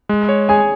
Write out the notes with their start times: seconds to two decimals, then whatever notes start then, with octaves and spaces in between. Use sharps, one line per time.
0.09 G#3
0.29 C#5
0.49 G#4 G#5